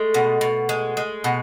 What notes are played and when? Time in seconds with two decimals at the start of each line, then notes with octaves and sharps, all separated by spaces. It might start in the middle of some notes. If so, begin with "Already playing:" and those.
Already playing: G#3 A3
0.14 B2
0.41 B2
0.69 G#3
0.97 G#3
1.24 B2